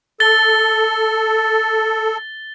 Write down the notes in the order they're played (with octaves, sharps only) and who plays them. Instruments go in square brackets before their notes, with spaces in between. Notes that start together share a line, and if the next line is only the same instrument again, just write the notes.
[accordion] A4 [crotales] A6 G7